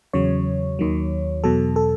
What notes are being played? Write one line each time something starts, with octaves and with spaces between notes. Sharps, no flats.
E2 C#3 F#3 C#5
D#2 D#3 F#3
E2 B2 F#3 A4
A4